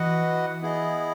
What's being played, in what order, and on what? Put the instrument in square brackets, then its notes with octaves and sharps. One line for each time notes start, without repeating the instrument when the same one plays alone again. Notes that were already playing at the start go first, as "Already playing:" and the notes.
Already playing: [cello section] E3 [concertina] F#4 B4 D#5 F#5
[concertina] B3 E4 G#4 D#5